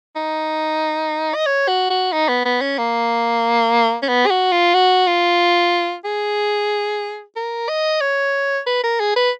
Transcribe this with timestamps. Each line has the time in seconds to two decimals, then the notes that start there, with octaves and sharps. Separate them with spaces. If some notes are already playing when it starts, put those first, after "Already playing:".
0.16 D#4
1.35 D#5
1.47 C#5
1.68 F#4
1.90 F#4
2.12 D#4
2.29 B3
2.45 B3
2.61 C#4
2.78 A#3
4.03 C#4
4.09 B3
4.26 G#4
4.31 F#4
4.52 F4
4.74 F#4
5.07 F4
6.05 G#4
7.36 A#4
7.69 D#5
8.01 C#5
8.67 B4
8.84 A#4
9.00 G#4
9.16 B4